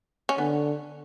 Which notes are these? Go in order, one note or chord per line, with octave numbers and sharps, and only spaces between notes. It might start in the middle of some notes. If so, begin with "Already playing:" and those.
C#4
D3 B3